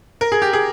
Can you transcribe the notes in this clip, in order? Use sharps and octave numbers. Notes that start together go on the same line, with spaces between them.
A#4
G#4
G4
G#4